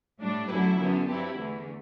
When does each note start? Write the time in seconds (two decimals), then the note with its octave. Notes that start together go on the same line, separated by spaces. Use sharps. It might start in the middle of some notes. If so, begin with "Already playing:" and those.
0.20 A2 G3 D4
0.48 F#2 D3 F#3 A3 E4 G4 B4
0.78 F#2 D3 F#3 B3
1.06 G2 F#3 C4 E4 G4
1.36 E2 D3 A3